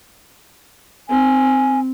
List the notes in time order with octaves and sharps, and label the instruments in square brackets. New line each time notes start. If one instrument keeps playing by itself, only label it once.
[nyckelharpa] C4 [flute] G#5